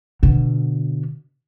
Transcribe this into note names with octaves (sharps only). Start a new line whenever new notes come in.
B2 D3